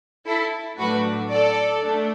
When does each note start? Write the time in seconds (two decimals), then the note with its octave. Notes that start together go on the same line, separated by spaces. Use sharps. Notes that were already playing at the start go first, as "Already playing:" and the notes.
0.26 E4 A4
0.78 A2 F#3 A3 D4 F#4 B4
1.30 A4 D5
1.82 A3 D4